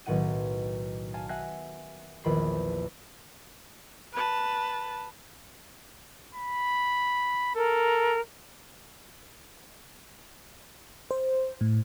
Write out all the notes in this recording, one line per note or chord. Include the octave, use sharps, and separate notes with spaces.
B1 A2 D#3 D#4 F#5 D#7
F5 G#5 A5
E5 F#5 G#5 F#6 A#6 C7
A#1 E2 D#3 B5 C7
B4 A5
B5
A4 A#4
C5
A2